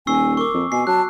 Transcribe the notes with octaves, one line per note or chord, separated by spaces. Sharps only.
D#1 G#5 C#6 E6 C7
A#4 C#6 D6
F2
B2 G#5 C7
F#3 A5 F#6